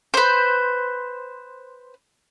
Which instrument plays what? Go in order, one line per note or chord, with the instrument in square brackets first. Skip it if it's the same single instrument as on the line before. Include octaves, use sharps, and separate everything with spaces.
[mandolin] B4 C5